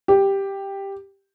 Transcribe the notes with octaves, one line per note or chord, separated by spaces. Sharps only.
G4